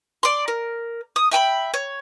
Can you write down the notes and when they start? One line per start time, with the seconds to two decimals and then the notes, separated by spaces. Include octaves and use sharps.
0.23 D5 C6
0.48 A#4
1.16 D#6
1.31 E5 G5 A#5 B5
1.74 C#5